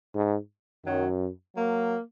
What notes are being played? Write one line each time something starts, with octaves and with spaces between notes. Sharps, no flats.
G#2
F#2 D#3 F#3
F#3 A#3